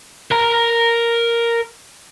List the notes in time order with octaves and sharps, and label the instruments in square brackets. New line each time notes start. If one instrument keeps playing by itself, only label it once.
[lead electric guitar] A#4 A#5